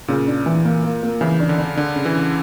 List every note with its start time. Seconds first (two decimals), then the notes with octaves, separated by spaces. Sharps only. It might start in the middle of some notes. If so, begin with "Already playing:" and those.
0.08 A#2 C#3
0.27 D4
0.46 E3
0.65 A#3
0.83 A#3
1.03 A#3
1.21 C#3 E3
1.40 D4
1.49 D3
1.58 D4
1.77 D3 D4
1.96 C#3
2.05 E3
2.15 C#3